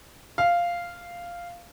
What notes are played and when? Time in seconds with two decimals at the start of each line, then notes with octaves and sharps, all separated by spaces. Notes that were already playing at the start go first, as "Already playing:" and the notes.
0.38 F5